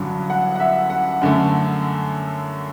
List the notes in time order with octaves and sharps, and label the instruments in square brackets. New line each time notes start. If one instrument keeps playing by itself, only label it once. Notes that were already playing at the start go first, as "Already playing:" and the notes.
Already playing: [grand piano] A1 G2 D3 F#3
F#5
F#5
E5
F#5
F#2 D3 A3